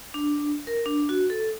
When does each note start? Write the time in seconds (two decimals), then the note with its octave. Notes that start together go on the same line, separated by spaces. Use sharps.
0.14 D4
0.67 A#4
0.86 D4
1.09 F#4
1.30 A4